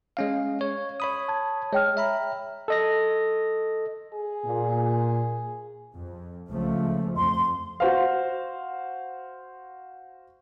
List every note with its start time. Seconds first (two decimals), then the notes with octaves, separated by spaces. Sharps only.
0.17 G#3 C#4 F5
0.61 C#5
1.00 C#5 B5 D#6
1.28 A5 G#6
1.73 G#3 C#5 G5 F6
1.97 E5 A#5 B5
2.68 A4 D#5 A#6
4.13 G#4
4.46 A#2
5.94 F2
6.50 C#2 F3 A3
7.17 F2 C6
7.80 F#4 C5 F5